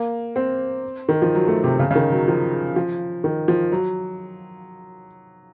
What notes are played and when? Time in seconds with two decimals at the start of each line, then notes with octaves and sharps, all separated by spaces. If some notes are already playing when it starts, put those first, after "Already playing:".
Already playing: A#3
0.36 C4
1.09 D#3
1.22 F3
1.35 F#3
1.48 A3
1.64 C3
1.79 C#3
1.91 C#3
1.95 D#3
2.12 F#3
2.28 F3
2.76 F3
3.24 D#3
3.48 F3
3.72 F#3